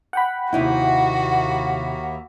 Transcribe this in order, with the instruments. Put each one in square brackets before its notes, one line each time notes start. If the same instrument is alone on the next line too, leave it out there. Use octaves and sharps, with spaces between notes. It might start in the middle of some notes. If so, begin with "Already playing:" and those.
[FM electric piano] F#5 G5 B5
[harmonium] D#2 A#3 E5 [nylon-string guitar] C3 D#4 E4 [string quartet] F#4